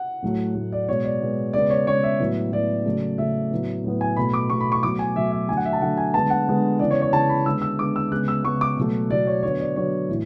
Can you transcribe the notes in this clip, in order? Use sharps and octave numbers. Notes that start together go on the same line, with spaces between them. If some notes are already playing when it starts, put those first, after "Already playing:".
Already playing: F#5
A2 F#3 A3
A2 F#3 A3
D5
B2 G#3 B3 C#5
D5
B2 G#3 B3
C#3 G#3 B3 D5
C#5
C#3 G#3 B3 C#5
E5
A2 F#3 B3
A2 F#3 B3 D5
C#3 F#3 A3
C#3 F#3 A3 E5
A2 F#3 B3
A2 F#3 B3
G#5
B2 A3 B5
D6
B2 A3 C#6
B5
C#6
B2 F#3 A3 D6
G#5
B2 F#3 A3 E5
E5
D3 F#3 A3 G#5
F#5
E5
A5
D3 F#3 A3 F#5
G#5
D3 G#3 B3 A5
F#5
D3 G#3 B3
C#3 E3 B3 D5
C#5
C#5
C#3 E3 B3 A5
B5
D3 G#3 B3 E6
E6
D3 G#3 B3 D6
E6
C#3 G#3 B3 F#6
E6
C#3 G#3 B3 C#6
D6
B2 F#3 A3
B2 F#3 A3 D5
C#5
D3 F#3 B3 C#5
D5
D3 F#3 B3 C#5
A2 E3